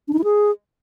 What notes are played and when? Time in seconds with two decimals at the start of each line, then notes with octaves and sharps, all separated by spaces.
0.08 D4
0.13 D#4
0.19 E4
0.24 G#4